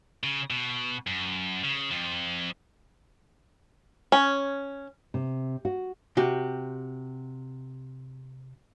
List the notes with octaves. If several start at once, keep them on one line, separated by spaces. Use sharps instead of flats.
C#3
B2
F#2
C#3
F2 F3
C#4
C3
F#4
C3 F#4 G4